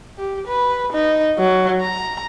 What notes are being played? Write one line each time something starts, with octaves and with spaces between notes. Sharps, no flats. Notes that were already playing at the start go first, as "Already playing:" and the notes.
G4
B4
D#4
F#3
A#5